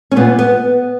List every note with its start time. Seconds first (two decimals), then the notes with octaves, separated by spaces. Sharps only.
0.11 C#4
0.16 A#2 B3
0.39 B3